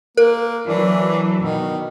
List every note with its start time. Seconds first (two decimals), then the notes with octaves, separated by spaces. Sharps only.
0.17 A#3 A#4
0.67 E3 F#3 D4
1.43 B2 D#3